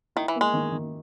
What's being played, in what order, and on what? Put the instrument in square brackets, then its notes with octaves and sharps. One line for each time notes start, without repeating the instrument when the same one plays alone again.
[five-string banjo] D#3 [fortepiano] E4
[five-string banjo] E3
[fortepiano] A#3
[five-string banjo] G#3
[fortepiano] D#3
D#3